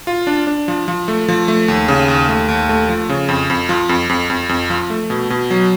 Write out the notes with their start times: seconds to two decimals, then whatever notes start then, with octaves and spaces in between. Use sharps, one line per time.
0.07 F4
0.27 D4
0.47 D4
0.68 F3
0.88 F3
1.08 A3
1.28 F3
1.48 A3
1.68 D#2
1.88 C#3
2.08 D#2
2.29 A3
2.48 D#2
2.69 A3
2.89 F3
3.09 C#3
3.29 F2
3.50 F2
3.69 F3
3.89 F2
4.09 F2
4.30 F2
4.49 F2
4.70 F3
4.90 A3
5.10 B2
5.30 B2
5.50 F#3